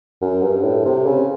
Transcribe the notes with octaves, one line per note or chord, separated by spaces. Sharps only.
F#2
G2
A2
C3
C#3